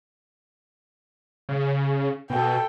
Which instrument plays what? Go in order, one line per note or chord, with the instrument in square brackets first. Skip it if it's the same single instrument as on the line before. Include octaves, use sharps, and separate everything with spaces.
[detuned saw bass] C#3
[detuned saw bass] B2 [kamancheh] A4 G5